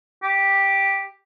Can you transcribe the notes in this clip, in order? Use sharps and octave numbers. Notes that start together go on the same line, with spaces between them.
G4